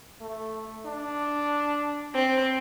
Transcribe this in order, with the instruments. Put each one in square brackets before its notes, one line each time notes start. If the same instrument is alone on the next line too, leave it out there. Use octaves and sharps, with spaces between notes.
[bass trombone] A3
D4
[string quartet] C4